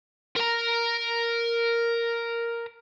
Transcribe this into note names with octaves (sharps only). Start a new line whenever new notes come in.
A#4 A#5